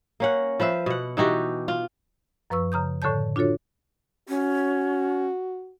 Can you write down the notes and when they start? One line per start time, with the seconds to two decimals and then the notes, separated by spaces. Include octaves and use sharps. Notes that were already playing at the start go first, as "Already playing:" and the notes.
0.20 A#3 C#4 F#5
0.60 F3 B4 C5 E5
0.86 B2 F#5
1.17 E3 D#4 F#4 G4
1.68 F4
2.50 F#2 F3 B4 C#6 E6
2.72 C#3 A#5 D#6 G6
3.02 A2 D3 A4 C#5 A5 G6
3.36 D4 F4 F#4 A4 C#5
4.29 C#4 F#4